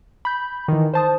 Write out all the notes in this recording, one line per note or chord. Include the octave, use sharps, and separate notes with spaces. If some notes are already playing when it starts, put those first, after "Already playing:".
B5 G6
D#3 E3
C5 A5 D#6